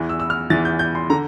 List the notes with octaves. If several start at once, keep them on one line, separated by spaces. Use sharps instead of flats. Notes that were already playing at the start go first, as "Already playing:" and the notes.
Already playing: E2 E3
E6
E6
F6
E2 E3 A6
G6
G6
C6
D3 A#5